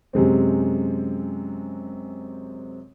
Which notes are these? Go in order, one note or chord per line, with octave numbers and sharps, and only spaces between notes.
F#2 C3 G#3 C4